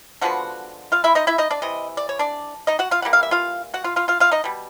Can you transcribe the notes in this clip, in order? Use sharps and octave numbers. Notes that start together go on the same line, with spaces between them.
D3 F3 G#3 B3 F#4 F#5
F4 F5
E4 E5
D#4 D#5
E4 E5
D#4 D#5
D4 D5
C3 E3 D#5
D5
C#5
D4 D5
D#4 D#5
F#4 F#5
F4 F5
E3 G3 A#3 F#5
F5
E5
F4 F5
F#4 F#5
F4 F5
F4 F5
F4 F5
F4 F5
D#4 D#5
B2 G3